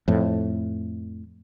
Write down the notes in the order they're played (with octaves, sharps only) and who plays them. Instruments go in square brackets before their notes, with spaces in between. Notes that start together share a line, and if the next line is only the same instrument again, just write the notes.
[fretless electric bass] F2 A2